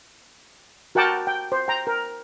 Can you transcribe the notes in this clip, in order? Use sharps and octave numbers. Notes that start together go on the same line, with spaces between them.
F#4 A#4 F#5 G5 A5 D6
G5
C5
G5 A#5
A#4